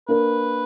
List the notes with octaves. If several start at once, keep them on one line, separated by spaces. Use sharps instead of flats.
A#3 D4 A#4 B4